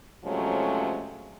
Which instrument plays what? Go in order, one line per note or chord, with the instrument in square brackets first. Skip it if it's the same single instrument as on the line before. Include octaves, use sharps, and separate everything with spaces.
[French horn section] C3 F3 F#3 G#3 A3 C#4